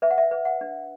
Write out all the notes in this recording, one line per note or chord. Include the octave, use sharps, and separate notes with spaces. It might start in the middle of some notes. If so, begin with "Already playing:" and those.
B4 E5
F#5
E5
B4
F#5
D4